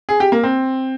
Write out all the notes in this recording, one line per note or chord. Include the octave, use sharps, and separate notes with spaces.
G#4
G4
A#3
C4